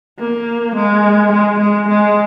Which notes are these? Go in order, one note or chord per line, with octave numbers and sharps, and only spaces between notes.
A#3
G#3
G#3
G#3
G#3